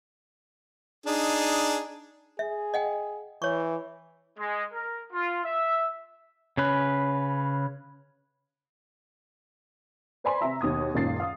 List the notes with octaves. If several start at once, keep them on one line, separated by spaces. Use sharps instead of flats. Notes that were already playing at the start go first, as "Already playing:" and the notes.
D4 D#4 G#4
G#4 E5
D#5 F#5 G5
E3 C#5 C#6
G#3
A#4
F4
E5
C#3 C#4 B4
B4 C5 D5 G#5 B5 C6
C3 E5 A#5
D#2 B2 D#6 G#6
F#1 C#2 A#2 D#3 A6 C7
F5 D#6